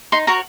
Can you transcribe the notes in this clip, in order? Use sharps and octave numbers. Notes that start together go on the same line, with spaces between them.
D#4 C6
F#4 A#4 C#5 A#5